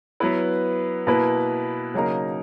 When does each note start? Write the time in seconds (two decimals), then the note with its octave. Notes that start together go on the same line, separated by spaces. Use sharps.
0.20 F#3 B3 E4 B4
1.07 B2 A#3 E4 B4
1.94 C#3 F#3 A#3 D#4 A#4